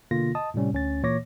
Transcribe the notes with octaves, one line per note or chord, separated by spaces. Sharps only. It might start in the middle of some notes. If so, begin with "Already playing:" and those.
B2 D3 A#3 F4 A#6
D#5 A5 D#6
A2 C3 G3 C#4
D2 C#4 A6
A#2 E3 A#3 C#5 D6 A#6